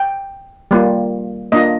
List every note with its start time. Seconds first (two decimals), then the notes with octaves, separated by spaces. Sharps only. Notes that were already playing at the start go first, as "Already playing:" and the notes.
Already playing: G5
0.71 G3 A#3 F4
1.52 A#3 D4 F4 D#5